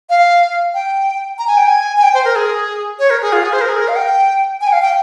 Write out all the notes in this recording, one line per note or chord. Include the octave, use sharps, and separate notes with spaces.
F5
G5
A#5
G#5
G5
G#5
G#5
G5
C5
A#4
G#4
C#5
A#4
G#4
F4
G#4
C5
A#4
G#4
A#4
F5
G5
G#5
G5
F5
G5